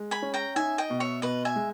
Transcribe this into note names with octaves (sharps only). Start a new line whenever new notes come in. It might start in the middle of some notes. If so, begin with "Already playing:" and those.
Already playing: G#3
G#5 B5
C#4
G5 A#5
D#4 E5 G#5
D#5 G5
B2
C#5 E5
B2 B4 D#5
E5 G#5
G#3